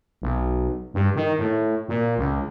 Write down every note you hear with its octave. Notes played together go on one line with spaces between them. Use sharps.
B1
G2
D#3
A2
A#2
C#2